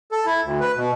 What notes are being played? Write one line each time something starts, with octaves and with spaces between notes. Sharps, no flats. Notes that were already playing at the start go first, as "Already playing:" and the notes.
A4
E4
D2
B4
B2